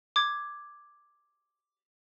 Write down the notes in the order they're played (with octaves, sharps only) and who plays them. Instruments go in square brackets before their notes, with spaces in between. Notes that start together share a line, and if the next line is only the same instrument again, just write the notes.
[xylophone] D6 G#6